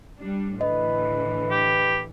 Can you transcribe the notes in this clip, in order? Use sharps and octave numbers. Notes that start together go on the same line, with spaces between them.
G3 D4
A2 D3 E3 B4 D#5
G4